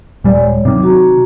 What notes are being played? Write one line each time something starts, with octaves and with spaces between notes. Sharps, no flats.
D#1 G3 D5 G#5
G#3 C#5
C3 D#3 F#3 D6
F#4 A#5